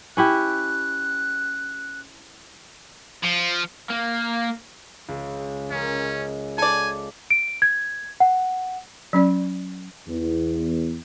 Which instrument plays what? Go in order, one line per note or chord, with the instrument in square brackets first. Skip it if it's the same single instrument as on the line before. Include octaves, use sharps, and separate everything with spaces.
[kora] C#4 E4 G4 [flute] F#6
[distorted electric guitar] F3
[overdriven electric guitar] A#3
[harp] C#2
[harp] G#3 A#4 [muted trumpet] C#4
[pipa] A4 D5 [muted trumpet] G#5
[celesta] D7
G#6
F#5
[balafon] F#3 C#4 D5
[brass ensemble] E2